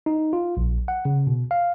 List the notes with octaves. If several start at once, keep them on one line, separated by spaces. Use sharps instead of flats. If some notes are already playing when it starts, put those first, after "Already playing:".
D#4
F4
A#1
F#5
C#3
B2
F5